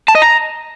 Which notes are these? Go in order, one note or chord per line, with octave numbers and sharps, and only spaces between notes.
A5
D#5
A#5